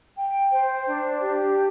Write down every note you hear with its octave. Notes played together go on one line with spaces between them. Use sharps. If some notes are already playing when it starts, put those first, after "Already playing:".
G5
C5
D4
G4
G5